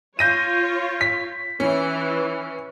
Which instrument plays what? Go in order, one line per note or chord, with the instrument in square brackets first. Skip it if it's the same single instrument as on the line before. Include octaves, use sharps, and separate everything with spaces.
[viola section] F4 C#5 [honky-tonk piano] G6 A#6 D#7
[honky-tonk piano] B6
[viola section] E3 [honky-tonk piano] C#4